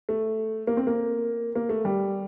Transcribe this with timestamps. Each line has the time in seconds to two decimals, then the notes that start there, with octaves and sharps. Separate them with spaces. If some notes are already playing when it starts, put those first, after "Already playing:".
0.09 A3
0.67 A#3
0.77 C4
0.87 A#3
1.55 A#3
1.69 A3
1.85 G3